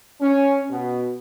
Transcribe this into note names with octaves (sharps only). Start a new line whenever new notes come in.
C#4
B2